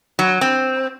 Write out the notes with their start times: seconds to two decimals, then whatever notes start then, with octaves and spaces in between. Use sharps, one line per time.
0.19 F#3
0.41 C4